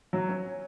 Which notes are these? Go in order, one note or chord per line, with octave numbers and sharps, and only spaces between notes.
F#3
C#4